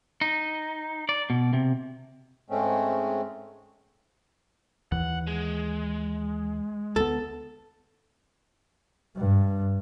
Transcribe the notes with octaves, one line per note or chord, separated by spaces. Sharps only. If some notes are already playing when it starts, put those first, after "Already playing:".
D#4
D5
B2
C3
G#2 G#3 A3 C4 C#4
D#2 E3 F#5
G#3
D2 B3 A4
G2